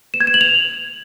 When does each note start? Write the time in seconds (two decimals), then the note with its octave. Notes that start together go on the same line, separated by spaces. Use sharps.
0.14 E7
0.20 G#6
0.27 E7
0.34 F#7
0.41 F7